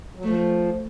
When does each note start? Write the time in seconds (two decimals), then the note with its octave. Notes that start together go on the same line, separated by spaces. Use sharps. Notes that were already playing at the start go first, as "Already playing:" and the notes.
0.15 F#3
0.24 F3 A3